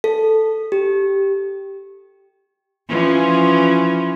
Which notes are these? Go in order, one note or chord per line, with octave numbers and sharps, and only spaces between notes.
A4
G4
E3 F3 C#4